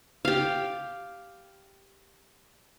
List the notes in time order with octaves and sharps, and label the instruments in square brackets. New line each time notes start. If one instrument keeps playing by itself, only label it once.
[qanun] G4 F5